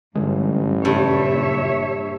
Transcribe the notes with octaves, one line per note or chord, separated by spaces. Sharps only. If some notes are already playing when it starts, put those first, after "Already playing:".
A1 G2 D3 G#3
F#1 G2 A#2 C#3 C#5 E5